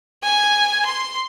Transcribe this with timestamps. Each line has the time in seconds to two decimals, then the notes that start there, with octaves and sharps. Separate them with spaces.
0.23 G#5
0.85 C6